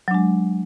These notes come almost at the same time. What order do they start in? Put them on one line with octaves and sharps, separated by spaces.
F#3 D4 G#3